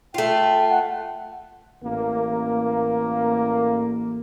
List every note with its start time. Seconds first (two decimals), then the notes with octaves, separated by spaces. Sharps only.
0.14 A3 F4 G5
0.70 F#5
1.83 A1 A#3